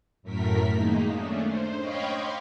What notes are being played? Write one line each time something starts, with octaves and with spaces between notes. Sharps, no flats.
F#2 A2 A3 A#4 B6
D#3 G#3 A#3 D#4
A3 C#4 D4
C5
C#5 D#5 F5 G5 B5 C#6
C6 D6